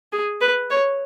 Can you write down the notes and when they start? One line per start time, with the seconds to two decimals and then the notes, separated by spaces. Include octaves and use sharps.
0.13 G#4
0.41 B4
0.70 C#5